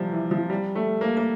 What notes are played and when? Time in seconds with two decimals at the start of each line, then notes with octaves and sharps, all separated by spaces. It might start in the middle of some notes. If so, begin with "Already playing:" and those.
Already playing: C3 F3 G3
0.12 E3
0.31 F3
0.50 G3
0.75 A3
1.01 A#3
1.17 A#3